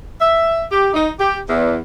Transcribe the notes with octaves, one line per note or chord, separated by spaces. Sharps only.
E5
G4
D#4
G4
E2